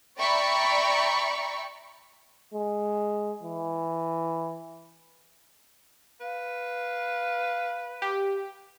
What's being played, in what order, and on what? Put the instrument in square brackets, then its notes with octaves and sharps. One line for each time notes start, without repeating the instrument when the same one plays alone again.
[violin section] D5 E5 G5 A#5 B5 C#6
[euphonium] G#3
E3
[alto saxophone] B4 [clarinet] F5
[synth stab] G4